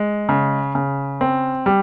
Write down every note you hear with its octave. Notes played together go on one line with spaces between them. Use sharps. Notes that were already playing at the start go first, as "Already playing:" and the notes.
Already playing: G#3
C#3
C#3
C4
G3